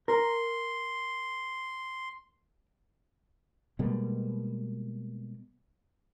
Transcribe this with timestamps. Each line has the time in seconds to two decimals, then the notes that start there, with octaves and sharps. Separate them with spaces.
0.08 A#4 C6
3.79 B2 G3 G#3 A#3